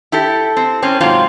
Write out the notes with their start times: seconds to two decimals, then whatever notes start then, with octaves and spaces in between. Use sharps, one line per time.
0.12 E4 G4 A4
0.56 C4
0.82 A2 C4 C#4
1.00 G#2 C3 F#3 C4 F4